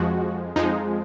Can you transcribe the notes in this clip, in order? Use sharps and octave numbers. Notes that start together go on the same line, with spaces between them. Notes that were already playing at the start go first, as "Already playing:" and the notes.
Already playing: F2 F3 G#3 F#4
F2 F3 G#3 D#4